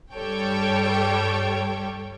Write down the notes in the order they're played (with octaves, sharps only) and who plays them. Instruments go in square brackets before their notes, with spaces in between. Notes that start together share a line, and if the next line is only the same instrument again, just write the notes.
[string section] G2 G3 A4 C#5 G5